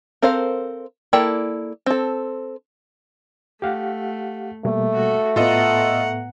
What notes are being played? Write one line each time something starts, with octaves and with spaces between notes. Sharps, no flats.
C4 A4 A#4 C5 F5
A#3 E4 A4 D5 G5
C4 A4
A3 G4 F5 F#5
B2 G3 A3 A#3
F#4 A4
A2 B3 F4 A4 D#5 F#5 A#5